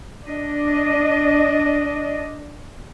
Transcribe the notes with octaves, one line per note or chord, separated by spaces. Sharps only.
D4 D#5